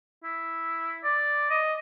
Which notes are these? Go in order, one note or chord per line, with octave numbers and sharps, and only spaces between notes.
E4
D5
D#5